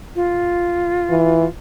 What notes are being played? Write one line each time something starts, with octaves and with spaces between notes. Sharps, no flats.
F4
E3